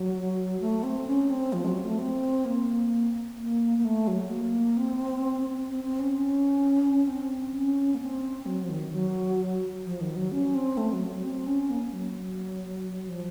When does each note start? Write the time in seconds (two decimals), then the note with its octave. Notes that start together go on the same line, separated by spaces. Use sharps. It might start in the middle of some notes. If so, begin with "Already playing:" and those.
Already playing: F#3
0.60 A3
0.83 C4
1.07 C#4
1.30 C4
1.53 F3
1.65 A3
1.68 F#3
1.84 A3
1.99 C4
2.45 A#3
3.38 A#3
3.78 A#3
3.84 A3
4.08 F#3
4.30 A#3
4.77 C4
5.69 C4
5.84 C4
5.99 C#4
6.15 C#4
7.07 C4
7.54 C#4
7.95 A#3
8.01 C4
8.46 F#3
8.64 F3
8.70 D#3
8.92 F#3
9.85 F3
10.01 D#3
10.16 F#3
10.32 C#4
10.55 C4
10.77 A3
10.93 F#3
11.09 F#3
11.24 C4
11.47 C#4
11.70 A#3
11.93 F#3
13.08 F3